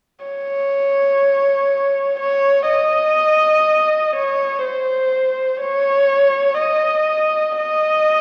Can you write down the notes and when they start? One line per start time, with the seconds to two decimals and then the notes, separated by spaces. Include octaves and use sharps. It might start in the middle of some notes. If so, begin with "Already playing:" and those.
0.25 C#5
2.20 C#5
2.69 D#5
4.16 C#5
4.64 C5
5.61 C#5
6.59 D#5
7.57 D#5